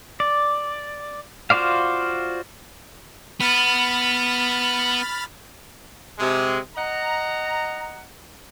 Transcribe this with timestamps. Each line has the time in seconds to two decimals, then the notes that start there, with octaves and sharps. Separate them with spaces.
0.20 D5
1.50 F4 F#4 C5 D5 F5
3.40 B3 B5 F6 A6
6.19 C3 G#3
6.76 D#5 F#5 A#5